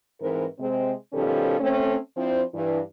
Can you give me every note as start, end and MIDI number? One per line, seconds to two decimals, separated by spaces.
0.21 0.44 44
0.21 0.44 52
0.21 0.44 60
0.21 0.44 70
0.21 0.44 71
0.59 0.92 48
0.59 0.92 56
0.59 0.92 60
1.13 1.56 47
1.13 1.56 51
1.13 1.56 53
1.13 1.56 55
1.13 1.56 61
1.13 1.56 69
1.60 1.96 57
1.60 1.96 60
1.60 1.96 61
2.16 2.42 53
2.16 2.42 60
2.16 2.42 62
2.16 2.42 64
2.16 2.42 72
2.54 2.79 43
2.54 2.79 52